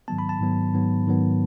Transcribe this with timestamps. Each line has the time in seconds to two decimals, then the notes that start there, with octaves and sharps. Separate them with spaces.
0.08 G#2 D#3 F#3 B3 A5
0.19 B5
0.29 A5
0.41 G#2 D#3 F#3 B3
0.74 G#2 D#3 F#3 B3
1.07 G#2 D#3 F#3 B3